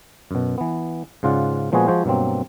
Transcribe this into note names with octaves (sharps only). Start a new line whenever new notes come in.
F#2 B2
E3 B3
G#2 C#3 F4 D5 F#5
A#2 F3 G#3 B3 F#4 G#4
F3 G#3 F#4 G#4 C5
G2 B2 F#3 A#3 C4